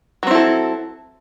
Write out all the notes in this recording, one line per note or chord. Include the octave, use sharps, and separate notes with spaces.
F#3 C4 E4 A4